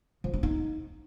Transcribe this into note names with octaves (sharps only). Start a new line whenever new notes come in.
F3
D4
D#4